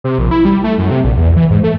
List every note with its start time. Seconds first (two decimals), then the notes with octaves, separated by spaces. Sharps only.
0.04 C3
0.19 A#1
0.31 E4
0.45 G3
0.64 A3
0.78 F#2
0.91 C3
1.04 A#1
1.17 E2
1.36 E3
1.50 G#2
1.64 A3